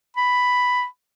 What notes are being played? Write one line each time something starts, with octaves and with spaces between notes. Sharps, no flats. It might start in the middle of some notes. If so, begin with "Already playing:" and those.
B5